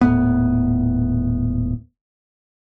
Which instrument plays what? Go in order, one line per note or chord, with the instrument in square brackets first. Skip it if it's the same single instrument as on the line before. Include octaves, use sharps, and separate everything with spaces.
[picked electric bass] D#1 A2 B3